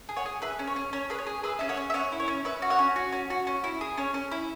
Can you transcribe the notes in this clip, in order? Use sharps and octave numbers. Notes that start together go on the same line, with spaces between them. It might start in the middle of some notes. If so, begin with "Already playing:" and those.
G#4
C#5 F#5
G#4
G#4 B4 E5
C#4
C#5
C#4
C#4 C#5
G#4 B4
C#5
G#4
G#4 B4 E5
C#4 E5
C#5 F#5
C#4
E5
C#4 C#5 F#5
E4
C#5
C#4
C#4 B4 E5
F#4
C#5 F#5
C#4
F#4
C#4
F#4
C#4
E4
G#4
C#4 C#5
C#4
E4